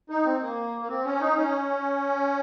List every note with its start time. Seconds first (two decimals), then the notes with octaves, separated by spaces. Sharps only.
0.10 D#4
0.26 C4
0.41 A#3
0.81 A#3
0.89 C4
1.05 C#4
1.21 D#4
1.36 C#4